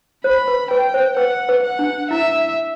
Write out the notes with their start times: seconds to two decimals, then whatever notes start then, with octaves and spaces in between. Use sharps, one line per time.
0.24 C5 B5
0.48 B4
0.71 B4 G5
0.94 C5
1.17 B4 F#5
1.49 B4
1.63 F#5
1.79 D4
2.11 E4 E5